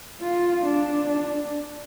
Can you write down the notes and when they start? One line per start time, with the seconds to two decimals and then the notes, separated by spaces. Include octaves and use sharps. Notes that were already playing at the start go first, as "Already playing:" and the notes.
0.21 F4
0.65 D4
1.09 D4